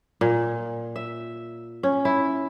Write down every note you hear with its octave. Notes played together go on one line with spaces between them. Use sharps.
A#2
E5
C#4
E4